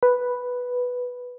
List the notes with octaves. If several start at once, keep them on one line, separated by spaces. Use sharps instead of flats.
B4